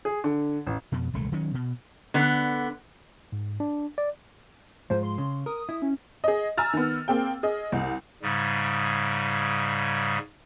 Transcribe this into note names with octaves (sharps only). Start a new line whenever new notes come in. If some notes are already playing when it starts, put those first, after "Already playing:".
G#4
D3
A1
F2 B2
D#1 C2 G#3 A3
D#3 F#3 C#4
B2
D3 B3
G#2
D4
D5
G#2 F3 C5
C6
C#3
A#4 D#6
E4
C#4
G#4 D#5
G#5 A#5 E6 F6 A6
D#3 B3
A#3 C4 G#4 G5
G#4 D#5
C2
G#2 C#3 G3